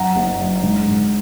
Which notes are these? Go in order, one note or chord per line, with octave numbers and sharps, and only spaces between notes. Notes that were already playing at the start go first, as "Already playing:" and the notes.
Already playing: F#2 F#5 A#5
F#1
F#2
G#2
G#2